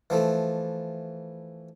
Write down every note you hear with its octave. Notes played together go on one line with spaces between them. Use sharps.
E3 F3 A3